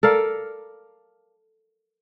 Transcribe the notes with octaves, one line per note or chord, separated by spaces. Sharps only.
A4 A#4 D5 F5